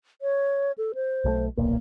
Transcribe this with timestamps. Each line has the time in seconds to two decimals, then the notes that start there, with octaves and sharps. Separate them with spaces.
0.22 C#5
0.78 A4
0.95 C5
1.24 B1 F#3 A3
1.57 D1 B1 A#2 A#3